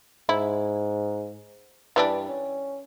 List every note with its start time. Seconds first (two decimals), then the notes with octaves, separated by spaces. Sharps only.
0.29 G#2 E4
1.96 G2 E3 G3 D4
2.29 C#4